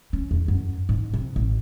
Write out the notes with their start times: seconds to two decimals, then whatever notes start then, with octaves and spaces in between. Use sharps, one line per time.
0.13 C#4
0.31 E2
0.48 F#2
0.89 G#2
1.14 C3
1.36 A1